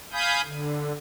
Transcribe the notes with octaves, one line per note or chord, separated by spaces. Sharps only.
F5 G#5 B5 D#6 G6
D3